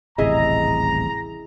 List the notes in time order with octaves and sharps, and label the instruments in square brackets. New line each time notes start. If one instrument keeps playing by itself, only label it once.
[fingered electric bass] D#1 A1 C3 [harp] E4 G#4 D#5 [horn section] A#5